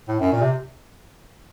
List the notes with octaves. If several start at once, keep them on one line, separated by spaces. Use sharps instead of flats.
A2
F#2
A#2
C3